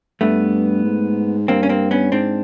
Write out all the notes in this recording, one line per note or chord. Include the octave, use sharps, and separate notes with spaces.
G2 A3 B3
G#2
G2 A#3 C4
C#4
A#3 C4
B3 C#4
G#2 C4 D4